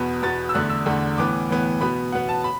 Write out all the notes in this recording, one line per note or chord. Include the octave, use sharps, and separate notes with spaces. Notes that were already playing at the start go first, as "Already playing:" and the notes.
Already playing: E2 B2 B3
E2 B2 B3 A6
E6
E2 D3 A3 F#6
E6
E2 D3 A3
A2 E3 B3 D6
A2 E3 B3
B2 B3 B5
B2 B3 F#5
A5
B5